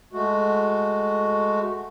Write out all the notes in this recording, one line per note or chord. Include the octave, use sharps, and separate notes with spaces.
G#3 A3 F#4